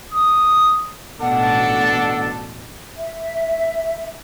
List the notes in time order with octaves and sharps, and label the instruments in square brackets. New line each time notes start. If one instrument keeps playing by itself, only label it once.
[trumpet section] D#6
[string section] A1 B2 [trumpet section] D4 A4 [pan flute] F#5
[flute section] E5